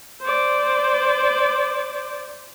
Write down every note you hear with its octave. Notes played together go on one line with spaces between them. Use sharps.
C5 D5